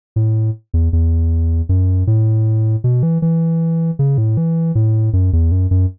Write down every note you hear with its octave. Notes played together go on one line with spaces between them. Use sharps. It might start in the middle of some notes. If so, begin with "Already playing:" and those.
A2
E2
E2
F#2
A2
B2
E3
E3
C#3
A2
E3
A2
F#2
E2
F#2
F#2